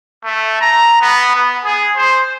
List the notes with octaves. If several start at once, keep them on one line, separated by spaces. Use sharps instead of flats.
A3
A#5
B3
B3
G#4
C5